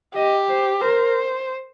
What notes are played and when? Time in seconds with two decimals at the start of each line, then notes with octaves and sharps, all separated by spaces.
0.15 G4 D#5
0.48 C5
0.81 A#4 C5